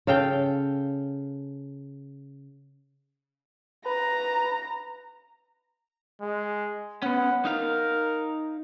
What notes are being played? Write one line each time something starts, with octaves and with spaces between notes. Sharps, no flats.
C#3 A4 F5 G5
B4 A#5
G#3
B3 C#4 F#5
D#4 A#4 F5